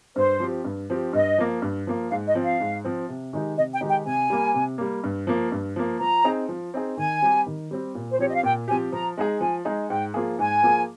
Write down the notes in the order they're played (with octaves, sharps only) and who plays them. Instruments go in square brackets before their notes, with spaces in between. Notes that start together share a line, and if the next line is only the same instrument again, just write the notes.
[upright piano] G2 [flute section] C5
[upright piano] F3 C4 G4
G2
F3 C4 G4
[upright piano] G2 [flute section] D#5
[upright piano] F3 A#3
G2
F3 A#3
[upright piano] G#2 [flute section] F5
[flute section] D#5
[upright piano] F3 C4
[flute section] F5
[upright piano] G#2
F3 C4
C3
D#3 G#3 D#4 G4
[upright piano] C3 [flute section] D#5
[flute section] G5
[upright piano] D#3 G#3 D#4 G4
[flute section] G5
[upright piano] C3 [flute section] G#5
[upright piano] G3 A#3
C3
G3 A#3
G2
F3 A#3
G2
F3 A#3
[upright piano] F3 [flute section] A#5
[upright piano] C4 D#4 G#4
F3
C4 D#4 G#4
[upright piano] D#3 [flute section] G#5
[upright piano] G3 C4 G4
D#3
G3 C4 G4
A#2
[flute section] C5
[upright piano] F3 C4 G4 [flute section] C#5
[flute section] D#5
F5
[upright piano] A#2 [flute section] G5
[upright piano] F3 C4 G4 [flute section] G#5
[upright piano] F3 [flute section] A#5
[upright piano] G#3 D#4 G#4
[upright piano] F3 [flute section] G#5
[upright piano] G#3 D#4 G#4
[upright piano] G#2 [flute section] G5
[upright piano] F3 A#3 F4 G#4
[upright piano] G#2 [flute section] G#5
[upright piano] F3 A#3 F4 G#4